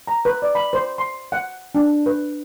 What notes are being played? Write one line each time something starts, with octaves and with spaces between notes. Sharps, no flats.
A#5
B4
D5
B5
C5
C6
F#5
D4
B4